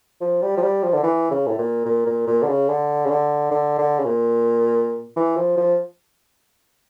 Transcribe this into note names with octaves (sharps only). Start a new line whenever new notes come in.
F3
G3
F3
G3
F3
D3
E3
C#3
A2
A#2
A#2
A#2
A#2
D3
C#3
D3
C#3
D3
D3
D3
C#3
A#2
E3
F3
F3